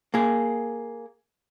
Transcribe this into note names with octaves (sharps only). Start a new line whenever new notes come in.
A#3 G#4